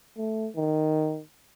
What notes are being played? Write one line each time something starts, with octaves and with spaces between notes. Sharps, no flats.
A3
D#3